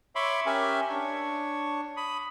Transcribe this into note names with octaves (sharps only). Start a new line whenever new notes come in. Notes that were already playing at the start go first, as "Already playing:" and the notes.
C#5 E5 B5 C6 D6
C#4 G4 A#4 E5 G#5
D4 C#5
B5 D#6